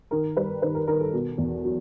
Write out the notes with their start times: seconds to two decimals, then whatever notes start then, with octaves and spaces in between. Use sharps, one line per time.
0.11 D#3 A#4
0.37 G3 B4
0.62 D#3 B4
0.75 A#4
0.88 D#3 A#4
1.01 A4
1.13 B2
1.38 E2
1.65 F#3